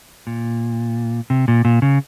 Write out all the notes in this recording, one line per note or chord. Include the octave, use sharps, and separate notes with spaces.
A#2
C3
A#2
A#2
C#3